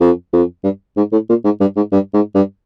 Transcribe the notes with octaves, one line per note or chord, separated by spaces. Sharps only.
F2
F2
G2
G#2
A2
A#2
G#2
G2
G#2
G2
G#2
G2